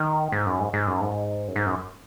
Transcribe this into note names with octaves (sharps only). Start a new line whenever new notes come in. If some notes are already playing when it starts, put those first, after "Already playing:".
Already playing: D#3
G#2
F#2
G#2
G#2
F#2
G#2
F#2
G#2
F#2